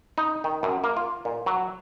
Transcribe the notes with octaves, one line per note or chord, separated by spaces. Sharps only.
D#4
D#3
F#2
A#3
F4
A#2
F#3